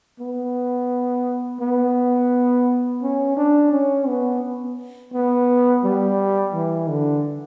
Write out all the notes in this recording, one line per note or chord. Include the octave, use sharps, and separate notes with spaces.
B3
B3
C#4
D4
C#4
B3
B3
G3
E3
D3